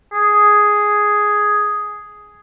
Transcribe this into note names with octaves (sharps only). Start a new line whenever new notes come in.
G#4